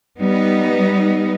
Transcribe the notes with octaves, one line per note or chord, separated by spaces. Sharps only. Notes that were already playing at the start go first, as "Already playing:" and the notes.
G3 B3 D#4